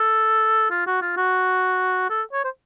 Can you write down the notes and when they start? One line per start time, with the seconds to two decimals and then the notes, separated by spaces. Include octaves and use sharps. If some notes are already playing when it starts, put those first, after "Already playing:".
Already playing: A4
0.71 F4
0.87 F#4
1.02 F4
1.17 F#4
2.10 A4
2.33 C#5
2.44 C5